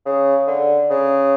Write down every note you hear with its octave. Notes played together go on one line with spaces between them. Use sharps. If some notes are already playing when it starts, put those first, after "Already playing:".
C#3
D3
C#3